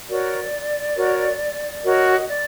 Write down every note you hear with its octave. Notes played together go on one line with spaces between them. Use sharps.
F#4 A#4 C#5 D5
F#4 A#4 C#5
F#4 A#4 C#5 D#5
D5